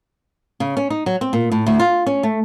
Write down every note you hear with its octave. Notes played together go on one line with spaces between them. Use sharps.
C#3
C#4
D#4
F#3
C4
A#2
A2
D2
F4
C#4
A3